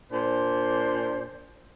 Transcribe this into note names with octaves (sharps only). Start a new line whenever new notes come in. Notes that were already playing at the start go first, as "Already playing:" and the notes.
A#2 D4 C5